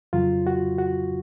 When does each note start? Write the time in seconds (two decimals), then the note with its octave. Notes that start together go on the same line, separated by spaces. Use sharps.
0.13 F2 C#3 F#3 F4
0.47 F#4
0.78 F#4